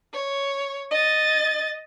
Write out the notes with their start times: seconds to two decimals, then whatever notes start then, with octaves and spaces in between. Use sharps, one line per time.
0.13 C#5
0.91 D#5 A6